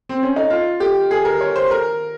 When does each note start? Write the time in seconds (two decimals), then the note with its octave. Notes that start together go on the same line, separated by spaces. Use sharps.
0.09 C4
0.23 C#4
0.36 D#4
0.50 F4
0.80 G4
1.11 G#4
1.25 A#4
1.41 C#5
1.56 C5
1.71 A#4